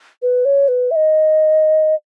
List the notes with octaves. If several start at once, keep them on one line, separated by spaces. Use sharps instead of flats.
B4
C#5
B4
E5
D#5